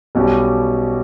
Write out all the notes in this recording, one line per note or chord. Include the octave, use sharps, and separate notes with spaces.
B1 B2 G3 C#4 G4